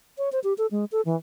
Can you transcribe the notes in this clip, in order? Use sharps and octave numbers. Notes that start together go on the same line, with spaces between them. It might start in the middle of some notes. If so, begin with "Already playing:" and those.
C#5
C5
G4
A4
G#3
A4
E3